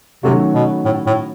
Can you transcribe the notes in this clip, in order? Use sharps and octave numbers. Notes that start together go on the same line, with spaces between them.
C3 D#3 F#3 A3 C#4 F#4
B2
A2
A2